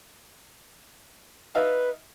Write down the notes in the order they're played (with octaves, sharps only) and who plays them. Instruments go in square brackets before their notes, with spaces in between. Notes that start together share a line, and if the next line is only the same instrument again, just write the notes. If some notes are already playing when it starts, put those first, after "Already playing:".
[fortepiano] D#4 E5 F5 [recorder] B4